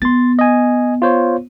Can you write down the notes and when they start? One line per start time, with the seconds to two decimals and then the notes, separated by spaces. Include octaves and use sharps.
0.02 B3 C6 A6
0.39 D#5 G#5
1.02 F4 C5 C#5